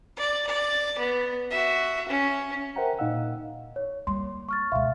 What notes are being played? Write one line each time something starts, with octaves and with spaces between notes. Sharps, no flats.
D5
D5
B3
F#4 E5
C#4
A#4 C5 E5 F#5 G5 A#5
A#2 D#4 D#5 F5 F#5 E6
C#5
G3 A#3 C6
C#6 F6 A6
C#2 B2 E5 F5 C6